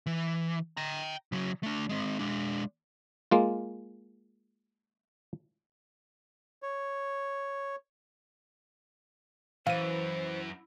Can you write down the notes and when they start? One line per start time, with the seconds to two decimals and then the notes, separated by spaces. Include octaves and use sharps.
0.06 E3
0.77 G5 A#5
1.32 C#3 F#3
1.63 A3 D4
1.89 G#3 C4
2.19 G#3 D4
3.31 G#3 A#3 F4
6.63 C#5
9.67 F#2 E3 C5 F5 D#7